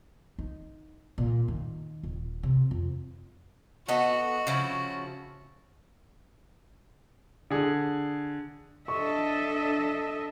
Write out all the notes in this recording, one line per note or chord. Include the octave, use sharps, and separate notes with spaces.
D#4
A#2
D#3
D#1
C3
F2
B3 F#4 A4 D#5
C#3 F3 E4
D3 G#4
D4 A4 D#5 E5 C#6